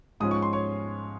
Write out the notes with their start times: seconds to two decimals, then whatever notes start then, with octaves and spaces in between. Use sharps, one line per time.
0.20 G#2 F3 G#3 C#4 F4 D#6
0.31 C#6
0.42 C6
0.53 C#5 C#6